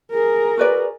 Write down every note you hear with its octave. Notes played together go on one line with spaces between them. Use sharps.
G#4 A#4
F#4 B4 D5